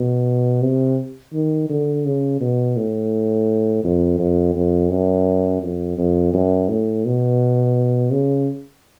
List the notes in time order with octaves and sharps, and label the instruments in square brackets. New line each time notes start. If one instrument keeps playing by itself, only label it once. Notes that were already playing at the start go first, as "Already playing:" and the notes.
Already playing: [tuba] B2
C3
D#3
D3
C#3
B2
A2
F2
F2
F2
F#2
F2
F2
F#2
A2
B2
C#3